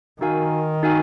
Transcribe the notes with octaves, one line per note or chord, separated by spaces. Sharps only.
D#3 D#4 F#4 A#4 F5 G#5
D#4 F#4 A#4 F5 G#5